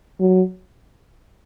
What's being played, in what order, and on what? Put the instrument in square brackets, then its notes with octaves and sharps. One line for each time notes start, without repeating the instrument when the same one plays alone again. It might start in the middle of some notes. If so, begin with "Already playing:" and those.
[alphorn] F#3